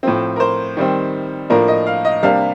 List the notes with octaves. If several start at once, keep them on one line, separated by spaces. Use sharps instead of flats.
A2 F3 C4
A#4
C5
D#3 G3 C4
A2 F3 A#3 D4 A#4
D#5
F5
D#5
C3 G3 A#3 D4 F5